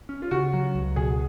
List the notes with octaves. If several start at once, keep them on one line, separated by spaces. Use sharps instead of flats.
C#4
F4
C#3 F#4
F#3
C#2
B2 G#4